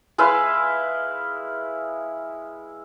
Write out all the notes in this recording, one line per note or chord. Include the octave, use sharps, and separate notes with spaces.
G#3 E4 B4 F5